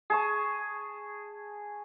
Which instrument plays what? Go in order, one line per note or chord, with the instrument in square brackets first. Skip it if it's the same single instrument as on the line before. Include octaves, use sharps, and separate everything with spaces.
[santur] G#4 A5 C#6